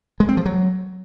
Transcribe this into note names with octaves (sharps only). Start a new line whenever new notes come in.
G#3
C4
F3
F#3